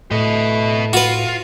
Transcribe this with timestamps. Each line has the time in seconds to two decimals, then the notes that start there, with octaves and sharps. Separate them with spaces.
0.11 A2 A3 B4 D#5
0.93 F4 F#4 B4